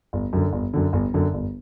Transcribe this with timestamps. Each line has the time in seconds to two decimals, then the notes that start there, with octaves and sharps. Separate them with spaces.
0.13 G1
0.33 F#2 D3
0.53 G1
0.74 F#2 D3
0.93 G1
1.14 F#2 D3
1.34 G1